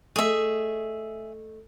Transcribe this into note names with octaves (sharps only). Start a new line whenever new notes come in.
A3 G#4 D#5 E5